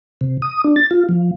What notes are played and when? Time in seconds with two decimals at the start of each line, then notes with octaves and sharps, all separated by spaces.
0.21 C3
0.42 D#6
0.64 D4
0.76 A6
0.91 F4
1.09 F3